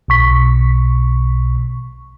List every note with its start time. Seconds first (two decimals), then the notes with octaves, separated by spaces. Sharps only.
0.08 B1 B2 C#6 B6